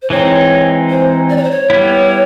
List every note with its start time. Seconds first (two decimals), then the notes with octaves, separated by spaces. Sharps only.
0.02 C5
0.10 E3 G#3 C4 D#4 C#5
0.90 C5
1.30 D5
1.37 C#5
1.44 C5
1.51 C#5
1.70 G3 B3 E4